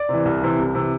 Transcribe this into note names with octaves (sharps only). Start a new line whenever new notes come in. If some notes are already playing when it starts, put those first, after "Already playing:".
Already playing: D5
C3 E3
C2
C3 E3
C2
C3 E3